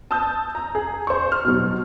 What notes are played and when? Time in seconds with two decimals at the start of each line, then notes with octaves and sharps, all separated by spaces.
0.11 A5 D#6 E6 G6
0.55 A#5
0.75 G#4
1.07 C5 C#6
1.32 F6
1.45 B2 F#3